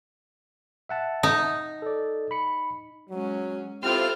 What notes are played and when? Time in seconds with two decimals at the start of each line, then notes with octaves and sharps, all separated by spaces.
0.89 E5 F#5 A5
1.23 D#4
1.82 A4 D5
2.31 B5 C#7
3.10 F#3 G#3 C#4
3.83 C4 E4 F4 G4 A4 C5 F6